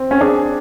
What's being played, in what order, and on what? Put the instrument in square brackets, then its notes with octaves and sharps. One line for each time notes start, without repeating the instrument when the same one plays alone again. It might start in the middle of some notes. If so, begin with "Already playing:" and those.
Already playing: [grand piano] C4
[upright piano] C#4
[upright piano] D4 [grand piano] G#4